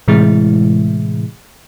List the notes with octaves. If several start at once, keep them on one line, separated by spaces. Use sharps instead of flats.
A2 C3 E3 G#3 E4